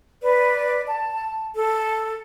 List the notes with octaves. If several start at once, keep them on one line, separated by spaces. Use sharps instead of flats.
B4 D5
A5
A4